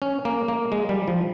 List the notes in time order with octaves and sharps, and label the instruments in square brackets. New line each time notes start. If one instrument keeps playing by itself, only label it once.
[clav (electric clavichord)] C#4
A#3
A#3
G#3
G3
F3